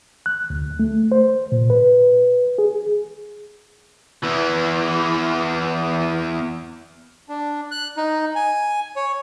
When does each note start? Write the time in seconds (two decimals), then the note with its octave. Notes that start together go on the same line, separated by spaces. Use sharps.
0.26 F#6
0.50 D2
0.79 A3
1.12 C5
1.52 A#2
1.70 B4
2.58 G#4
4.23 E2 E3
7.29 D4
7.71 F#6
7.97 D#4
8.36 G#5
8.96 C#5